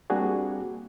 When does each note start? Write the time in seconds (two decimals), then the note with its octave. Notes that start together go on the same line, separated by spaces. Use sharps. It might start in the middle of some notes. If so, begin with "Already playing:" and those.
0.10 G3 A#3 C4 D4 F#4 G#4